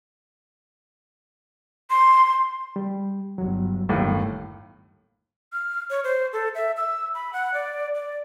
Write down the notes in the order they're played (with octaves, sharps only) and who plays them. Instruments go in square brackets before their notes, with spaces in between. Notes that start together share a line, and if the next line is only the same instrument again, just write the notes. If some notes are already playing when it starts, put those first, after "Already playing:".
[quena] C6
[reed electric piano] G3
[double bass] G1 [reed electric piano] F#3
[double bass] G1 [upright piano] D#2 A2
[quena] F6
C#5
C5
A4
E5
E6
B5
F#5
D5
D5